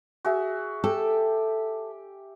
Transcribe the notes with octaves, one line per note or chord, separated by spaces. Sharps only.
F#4 G#4 E5
G4 A4 G5